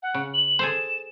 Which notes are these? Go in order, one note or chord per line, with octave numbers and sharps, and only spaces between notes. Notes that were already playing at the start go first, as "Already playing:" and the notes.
F#5
C#3
F#7
G#4 A4 C5 E7